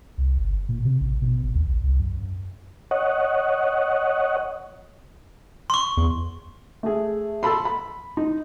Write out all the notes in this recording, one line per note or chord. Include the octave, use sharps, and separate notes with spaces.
C2
G1
A#2
C3
A1
B2
G#1
D#2
A#1
C2
F#2
C#5 D#5 F#5
C6 C#6
E2
A3 G#4
A4 A5 B5 C6
B5
D#4